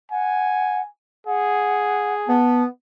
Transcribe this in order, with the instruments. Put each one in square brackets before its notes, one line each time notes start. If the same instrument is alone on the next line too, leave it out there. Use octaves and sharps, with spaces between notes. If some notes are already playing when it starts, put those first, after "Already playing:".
[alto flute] F#5 [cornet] G#5
[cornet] G#4 [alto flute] F#5
[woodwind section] B3 [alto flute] A5